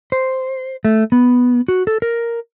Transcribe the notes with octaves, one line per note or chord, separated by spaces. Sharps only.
C5
A3
B3
F#4
A4
A#4